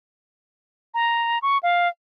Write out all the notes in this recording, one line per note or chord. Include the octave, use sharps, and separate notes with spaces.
A#5
C#6
F5